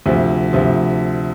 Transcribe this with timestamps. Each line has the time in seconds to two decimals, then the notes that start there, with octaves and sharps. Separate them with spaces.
0.06 D2 C3 F3
0.53 D2 C3 F3